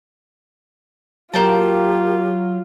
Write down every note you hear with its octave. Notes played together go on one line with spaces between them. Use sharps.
F#3 A#3 F4 G4 G5 A5